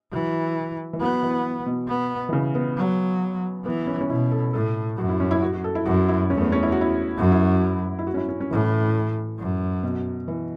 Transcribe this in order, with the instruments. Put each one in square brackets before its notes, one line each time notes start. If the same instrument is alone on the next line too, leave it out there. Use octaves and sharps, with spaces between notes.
[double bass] E3 [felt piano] F#3
[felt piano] E3
[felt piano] F#3 [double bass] B3
[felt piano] E3
B2
[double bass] B3
[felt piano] E3
C#3
B3
[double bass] F#3
[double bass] E3 [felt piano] B3
[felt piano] C#4
C#4
[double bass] B2 [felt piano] E4
[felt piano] A4
[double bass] A2 [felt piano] A4
[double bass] F#2 [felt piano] F#4
[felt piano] E4
C#4
E4
F#4
F#4
A4
E4
[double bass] F#2 [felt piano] F#4
[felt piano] E4
[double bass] E2 [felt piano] C#4
[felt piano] A3
B3
C#4
E4
F#4
E4
[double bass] F#2 [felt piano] F#4
[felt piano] E4
F#4
E4
F#4
C#4
E4
C#4
C#4
[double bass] A2 [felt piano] E3
[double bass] F#2
[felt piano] B2
E3